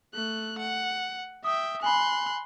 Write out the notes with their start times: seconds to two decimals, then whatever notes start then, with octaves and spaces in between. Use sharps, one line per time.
0.14 A3 F#6
0.59 F#5
1.44 E5 G5 D#6
1.83 G#5 B5 C6 F#6